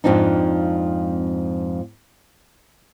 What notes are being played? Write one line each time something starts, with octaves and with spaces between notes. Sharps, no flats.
F2 G#2 F3 C4 D4 D#4